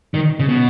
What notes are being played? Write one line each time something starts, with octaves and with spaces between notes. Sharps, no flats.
D#3
C#3
B2